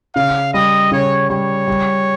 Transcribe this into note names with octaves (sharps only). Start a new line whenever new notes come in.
C#3 F5
G3 D#5
C#3 C#5
G3 C#5
G3